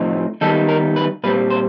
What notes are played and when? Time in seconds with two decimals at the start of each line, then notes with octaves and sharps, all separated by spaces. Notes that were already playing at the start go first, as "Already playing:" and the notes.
Already playing: A2 F3 A3 C4 D#4
0.41 D#3 G3 B3 D#4 A4
0.69 A#4
0.96 B4
1.24 A#2 G3 C4 B4
1.50 C5